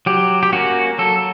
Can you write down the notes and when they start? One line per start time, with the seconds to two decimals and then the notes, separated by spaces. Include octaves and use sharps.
0.06 F#3 G4
0.43 G4
0.53 A#3 C#4 F#4
0.99 F#3 A4